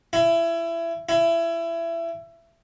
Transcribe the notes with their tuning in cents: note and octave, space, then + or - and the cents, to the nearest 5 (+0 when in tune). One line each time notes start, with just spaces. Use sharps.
E4 +25
E4 +25